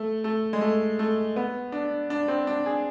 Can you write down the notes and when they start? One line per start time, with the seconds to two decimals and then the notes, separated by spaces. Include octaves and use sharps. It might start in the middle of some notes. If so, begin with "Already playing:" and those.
Already playing: A3
0.24 A3
0.53 G#3
0.61 A3
0.99 A3
1.36 B3
1.72 D4
2.10 D4
2.28 C4
2.47 D4
2.66 G#4